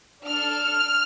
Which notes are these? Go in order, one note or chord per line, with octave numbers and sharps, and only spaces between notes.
D4 A4 F6